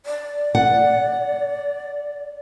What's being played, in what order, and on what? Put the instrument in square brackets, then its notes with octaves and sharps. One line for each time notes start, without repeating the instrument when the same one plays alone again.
[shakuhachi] D5
[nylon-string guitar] F#5